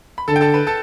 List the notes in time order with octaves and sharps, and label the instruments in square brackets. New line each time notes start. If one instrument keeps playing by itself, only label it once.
[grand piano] B5
[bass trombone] D3 [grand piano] A4 A5
[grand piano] G5
A4 A5
B4 B5
A4 A5